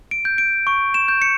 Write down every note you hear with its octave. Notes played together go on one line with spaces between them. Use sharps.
D7
G6
D7
C#6
E7
G6
C#7